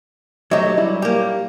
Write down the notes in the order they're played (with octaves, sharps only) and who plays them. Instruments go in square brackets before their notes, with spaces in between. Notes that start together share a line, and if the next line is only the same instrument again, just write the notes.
[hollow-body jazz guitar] F#3 G4 [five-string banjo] A3 D#5 E5
[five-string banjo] G3 E4
[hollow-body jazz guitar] A#3 G4